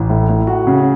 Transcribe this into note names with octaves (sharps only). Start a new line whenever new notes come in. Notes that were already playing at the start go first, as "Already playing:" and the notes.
Already playing: A1
A2
A2
F#4
C#3